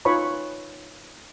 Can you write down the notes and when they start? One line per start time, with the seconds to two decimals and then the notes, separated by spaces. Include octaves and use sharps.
0.05 D#4 F4 B4 C#5 B5 C#6